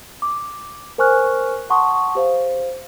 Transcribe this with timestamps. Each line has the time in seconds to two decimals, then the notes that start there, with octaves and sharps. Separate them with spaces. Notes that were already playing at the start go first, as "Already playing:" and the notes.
0.22 D6
0.98 A#4 C5 G#5 C#6 F6 F#6
1.70 F#5 A5 C6 C#6 D#6
2.15 G4 C5 F5